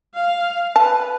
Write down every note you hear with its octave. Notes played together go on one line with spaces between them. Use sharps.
F5
B4 A5